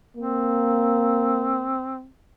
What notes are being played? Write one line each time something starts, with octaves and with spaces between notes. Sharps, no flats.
A#3 C4